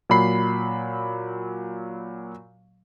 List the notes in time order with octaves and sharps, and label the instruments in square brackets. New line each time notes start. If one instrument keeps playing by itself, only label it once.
[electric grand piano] A#2 F#3 B5 C7